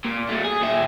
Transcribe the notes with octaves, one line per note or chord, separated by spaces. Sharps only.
A#2
F#3 A3
G#4
A#2 E5